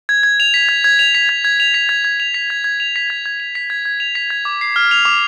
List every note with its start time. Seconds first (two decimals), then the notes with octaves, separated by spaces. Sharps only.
0.09 G#6
0.23 G#6
0.40 F7
0.54 B6
0.69 G#6
0.84 G#6
0.99 F7
1.15 B6
1.29 G#6
1.45 G#6
1.60 F7
1.74 B6
1.89 G#6
2.05 G#6
2.20 F7
2.34 B6
2.50 G#6
2.64 G#6
2.80 F7
2.96 B6
3.10 G#6
3.26 G#6
3.40 F7
3.55 B6
3.70 G#6
3.85 G#6
4.00 F7
4.15 B6
4.30 G#6
4.45 D6
4.61 C7
4.76 F6
4.91 F7
5.05 D6